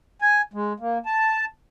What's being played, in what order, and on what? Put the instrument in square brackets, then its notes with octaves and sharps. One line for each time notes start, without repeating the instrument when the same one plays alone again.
[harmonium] G#5
G#3
A#3
A5